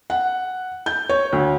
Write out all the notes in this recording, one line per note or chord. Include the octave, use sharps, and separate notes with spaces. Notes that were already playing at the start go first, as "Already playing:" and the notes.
F#5
G6
C#5
D2